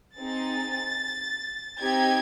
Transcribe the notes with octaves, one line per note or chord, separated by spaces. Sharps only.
C4 D#4 G#4 A6
C4 D#4 G4 G#6